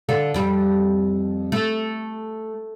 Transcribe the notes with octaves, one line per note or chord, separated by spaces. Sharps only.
D3 F4 A4
F2 G3
A3